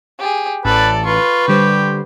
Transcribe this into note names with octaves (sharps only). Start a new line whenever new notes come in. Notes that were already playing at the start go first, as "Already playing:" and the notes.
G4 G#4
A1 A4 B4 D5
F4 B4 C#6
D3 G3 G4 C5